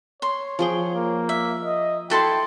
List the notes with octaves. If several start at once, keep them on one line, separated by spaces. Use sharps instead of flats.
C#5 C6
F3 G#4 G5
A#3
E5
D#5
E4 F#4 A4 G5 A5 C6